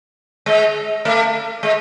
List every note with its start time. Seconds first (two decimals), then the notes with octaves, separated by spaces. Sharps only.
0.46 G#3
1.05 A3
1.63 G#3